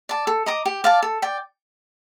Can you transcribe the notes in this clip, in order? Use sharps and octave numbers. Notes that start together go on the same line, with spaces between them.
D5 A5
A4
D#5 A#5 D6
G4
D5 F5 A5
A4
D5 G5